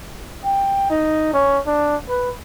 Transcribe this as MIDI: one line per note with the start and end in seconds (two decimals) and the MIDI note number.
0.44 0.88 79
0.90 1.31 63
1.34 1.59 61
1.67 1.96 62
2.09 2.30 71